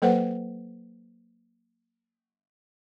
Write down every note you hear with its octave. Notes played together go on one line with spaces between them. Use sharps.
F#3 A#3 A4 B4 C5 F#5